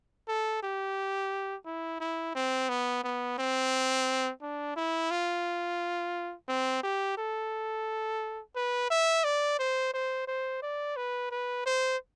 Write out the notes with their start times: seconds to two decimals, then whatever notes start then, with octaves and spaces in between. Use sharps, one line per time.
0.28 A4
0.63 G4
1.65 E4
2.00 E4
2.35 C4
2.69 B3
3.04 B3
3.38 C4
4.42 D4
4.76 E4
5.11 F4
6.48 C4
6.83 G4
7.18 A4
8.55 B4
8.90 E5
9.24 D5
9.59 C5
9.94 C5
10.27 C5
10.62 D5
10.96 B4
11.31 B4
11.66 C5